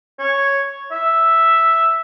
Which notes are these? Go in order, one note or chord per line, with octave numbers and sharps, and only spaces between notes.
C#5
E5